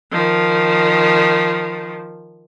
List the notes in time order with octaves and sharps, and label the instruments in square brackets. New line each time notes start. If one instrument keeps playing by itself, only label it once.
[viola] D#3 F3